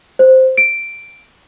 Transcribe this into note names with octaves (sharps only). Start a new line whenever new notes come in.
C5
D7